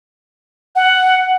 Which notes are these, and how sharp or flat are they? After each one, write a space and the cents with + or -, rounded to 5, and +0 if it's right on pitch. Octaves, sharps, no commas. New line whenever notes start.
F#5 +5